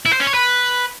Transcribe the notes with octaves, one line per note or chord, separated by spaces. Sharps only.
E4
C5
C#4
C#5
B4